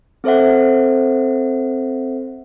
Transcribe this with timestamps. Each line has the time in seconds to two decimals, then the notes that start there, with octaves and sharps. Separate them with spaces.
0.24 C4 A4 C5 E5 F#5